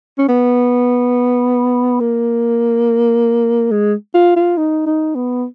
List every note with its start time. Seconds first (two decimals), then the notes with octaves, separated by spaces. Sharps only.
0.18 C#4
0.29 B3
2.00 A#3
3.71 G#3
4.14 F4
4.36 F4
4.58 D#4
4.86 D#4
5.15 B3